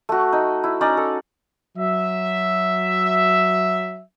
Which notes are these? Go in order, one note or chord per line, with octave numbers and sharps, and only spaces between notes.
A3 F#4
D#4
E4
C#4 D#4 D5 A#5
A4
F#3 E5